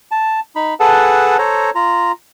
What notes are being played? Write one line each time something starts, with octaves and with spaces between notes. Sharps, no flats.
A5
D#4 B5
G#4 A4 B4 F#5 A5
A4 C5 C#5 A#5
F4 A#5